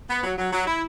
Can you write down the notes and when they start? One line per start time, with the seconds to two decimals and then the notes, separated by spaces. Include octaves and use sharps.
0.09 B3
0.23 F#3
0.38 F#3
0.52 F#3
0.66 E4